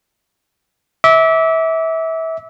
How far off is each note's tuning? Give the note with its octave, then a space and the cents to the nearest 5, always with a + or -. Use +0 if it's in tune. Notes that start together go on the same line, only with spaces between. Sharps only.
E5 -25 D6 -25